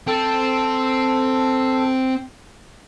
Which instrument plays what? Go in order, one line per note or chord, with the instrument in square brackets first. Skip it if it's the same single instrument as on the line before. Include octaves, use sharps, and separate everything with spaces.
[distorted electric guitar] C4 [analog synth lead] A4